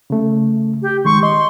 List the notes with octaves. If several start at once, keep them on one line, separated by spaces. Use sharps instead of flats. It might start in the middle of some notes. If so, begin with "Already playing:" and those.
C#3 A3
G4
D#3 G#3 C6 C#6
D#5 C6 C#6